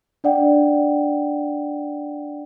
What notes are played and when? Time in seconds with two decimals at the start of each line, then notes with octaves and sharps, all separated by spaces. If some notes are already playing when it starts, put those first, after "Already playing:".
0.24 D4 D5 F#5 G5